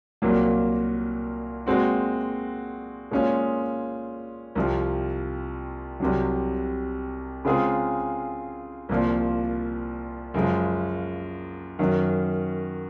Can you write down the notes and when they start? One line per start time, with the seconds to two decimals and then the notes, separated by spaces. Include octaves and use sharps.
0.22 C2 A#2 F#3 A#3
1.66 A#2 G#3 C4 F#4
3.11 A#2 G#3 C#4 F4 G#4
4.55 C2 C3 F3
6.00 C2 C3 F#3
7.45 C#3 G#3 C4 F4 G#4
8.89 C2 A#2 F3
10.34 F#2 C#3 F3 G#3
11.79 F#2 D#3 F#3